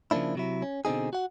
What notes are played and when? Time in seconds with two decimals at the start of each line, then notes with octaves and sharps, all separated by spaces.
0.11 C#3 F3 G3 A#3 D4 E4
0.35 C3 F#3 E4
0.62 C#4
0.85 B2 D3 C4 D#4 G#4
1.13 F#4 F#5